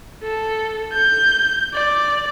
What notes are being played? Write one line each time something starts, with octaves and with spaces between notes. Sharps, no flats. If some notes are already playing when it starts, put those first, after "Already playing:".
A4
G6
D5